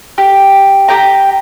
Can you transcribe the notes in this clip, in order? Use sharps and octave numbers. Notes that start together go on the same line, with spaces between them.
G4
G4 G5 A#5